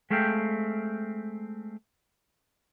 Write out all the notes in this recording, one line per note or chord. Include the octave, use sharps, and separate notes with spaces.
G#3 A3 C4 F5 G5